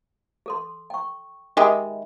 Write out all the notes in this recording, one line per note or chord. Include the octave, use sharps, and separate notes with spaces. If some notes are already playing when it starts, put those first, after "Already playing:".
G#4 A4 C6
G5 C#6
D#3 G#3 G4 D#5 E5 B5